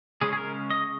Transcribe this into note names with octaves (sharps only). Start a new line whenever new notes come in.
C#3 G#3 C#4 G#4
G#4
A#4
D#5